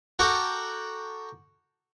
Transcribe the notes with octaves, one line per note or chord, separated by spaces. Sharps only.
F#4 A4 A#4 F#5 G5 D6